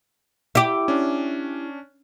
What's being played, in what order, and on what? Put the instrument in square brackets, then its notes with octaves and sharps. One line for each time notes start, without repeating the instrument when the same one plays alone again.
[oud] E4 G4
[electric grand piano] C#4 D4